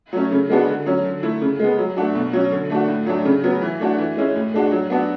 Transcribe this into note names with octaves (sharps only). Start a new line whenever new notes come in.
F#3 A3 C#4
C#3
G#3 B3 D4 F#4
D3
F#3 C#4
D3
A3 E4
C#3
G#3 B3
F#3
A3 D4 F#4
B2
F#3 C#4
D3
A3 D4 F#4
A2
F#3 A3 D4
C#3
F#3 B3
E3
A3 D4 F#4
E3
G#3 C#4 E4
A2
G#3 D4 F#4
F#3
B3 D4 F#4